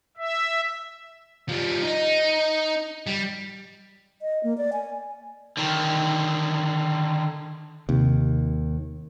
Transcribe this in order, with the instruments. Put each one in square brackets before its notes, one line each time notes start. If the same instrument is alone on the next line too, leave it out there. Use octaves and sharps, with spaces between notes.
[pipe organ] E5
[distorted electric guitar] F3 G3
D#4
G3
[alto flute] D#5
A#3
D5
G#5
[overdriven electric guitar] D3 D#3
[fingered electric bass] D#2 [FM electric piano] C3